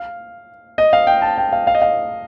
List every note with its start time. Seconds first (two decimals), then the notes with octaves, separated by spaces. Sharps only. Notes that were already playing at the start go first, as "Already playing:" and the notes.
Already playing: F5
0.78 D#5
0.93 F5
1.07 G5
1.22 A5
1.38 G5
1.52 F5
1.67 F5
1.75 D#5
1.82 F5